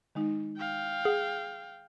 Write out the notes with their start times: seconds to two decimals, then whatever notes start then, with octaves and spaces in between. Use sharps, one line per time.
0.15 D#3 G#3 D#4
0.57 F5 G5
1.05 G#4 F#5